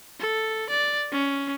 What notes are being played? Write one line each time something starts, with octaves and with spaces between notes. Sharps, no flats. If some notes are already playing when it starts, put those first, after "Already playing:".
A4
D5
C#4